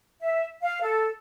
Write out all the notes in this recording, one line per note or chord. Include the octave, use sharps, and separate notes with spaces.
E5
F5
A4